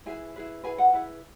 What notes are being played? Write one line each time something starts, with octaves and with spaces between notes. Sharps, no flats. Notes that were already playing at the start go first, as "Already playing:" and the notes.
E4 G#4 B4 G#5
E4 G#4 B4
E4 G#4 B4 G#5
F#5
E4 G#4 B4